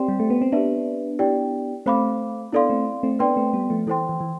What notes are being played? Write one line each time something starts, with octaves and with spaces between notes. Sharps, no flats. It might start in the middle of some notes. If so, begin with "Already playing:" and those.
Already playing: C4 G4 D5 G5 C6
G3
A3
B3
C4
B3 D4 G4 B4 E5
E4 G4 D5 G5
A3 C4 C5 F5 B5 D6
B3 D4 E4 A4 D5 F5 C6
A3 C4
A3 C4
B3 D4 B4 D5 G5 C6
A3 C4
G3 B3
F3 A3
E3 E4 A4 C5 G5 C6
E3
E3